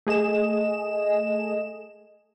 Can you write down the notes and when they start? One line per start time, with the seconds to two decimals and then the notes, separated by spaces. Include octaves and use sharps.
0.07 A3 G#4 D#5 E7